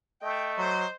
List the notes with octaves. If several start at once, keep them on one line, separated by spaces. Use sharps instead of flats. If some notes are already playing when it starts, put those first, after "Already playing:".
A3 D#5 G5
F#3 C5